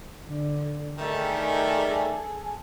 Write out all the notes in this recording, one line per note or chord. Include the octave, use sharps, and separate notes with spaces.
D3
D#3 G3 A3 G#4 A4